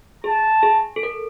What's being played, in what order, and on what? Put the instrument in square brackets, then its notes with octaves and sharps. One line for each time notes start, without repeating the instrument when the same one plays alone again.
[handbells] G#4 [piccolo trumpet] A5
[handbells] G#4
A4
A#4